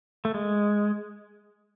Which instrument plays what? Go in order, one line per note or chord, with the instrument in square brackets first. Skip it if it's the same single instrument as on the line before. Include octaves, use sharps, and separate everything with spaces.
[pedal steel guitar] A3
G#3